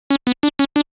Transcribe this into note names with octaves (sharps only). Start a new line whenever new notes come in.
C#4
B3
D4
C#4
D4